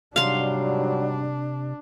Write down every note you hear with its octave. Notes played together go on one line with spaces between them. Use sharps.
G#2 C3 F#3 G3 D4 F5 C6